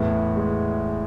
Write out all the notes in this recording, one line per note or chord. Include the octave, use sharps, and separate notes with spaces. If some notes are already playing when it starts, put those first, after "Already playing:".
Already playing: E2 A2 B3
G#3